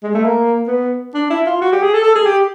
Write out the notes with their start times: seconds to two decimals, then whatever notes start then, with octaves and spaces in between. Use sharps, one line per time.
0.03 G#3
0.14 A3
0.25 A#3
0.68 B3
1.14 D4
1.30 E4
1.46 F4
1.62 F#4
1.72 G4
1.83 G#4
1.94 A4
2.04 A4
2.15 G#4
2.26 G4